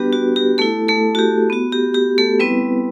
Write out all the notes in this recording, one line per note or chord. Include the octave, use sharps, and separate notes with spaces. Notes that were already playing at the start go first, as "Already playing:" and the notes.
Already playing: G3 B3 D4 F#4 G4 B4
F#4
G4
A3 E4 A4
A3 A4
F#4
G4
B3 F#4
G4
G4
A3 A4
G3 B3 C4 E4 B4